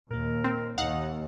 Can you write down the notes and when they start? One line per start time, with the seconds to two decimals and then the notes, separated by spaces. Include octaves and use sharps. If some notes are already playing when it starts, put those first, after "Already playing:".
0.11 D#2 A#2 A#3 A#4
0.44 C4
0.78 D#2 D#4 F5 F#5